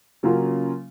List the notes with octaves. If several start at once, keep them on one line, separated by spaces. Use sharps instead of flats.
C#3 F#3 A#3 C#4 F4